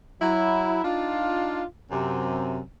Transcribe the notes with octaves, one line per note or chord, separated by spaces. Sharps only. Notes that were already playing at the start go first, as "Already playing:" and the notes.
F#3 E4
D4 D#4 F4
F#2 C3